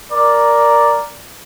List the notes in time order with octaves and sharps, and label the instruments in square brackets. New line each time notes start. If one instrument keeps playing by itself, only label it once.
[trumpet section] A#4 D5